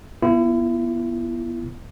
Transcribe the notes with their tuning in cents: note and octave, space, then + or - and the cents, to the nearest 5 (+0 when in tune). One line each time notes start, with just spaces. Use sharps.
B3 -15 E4 +35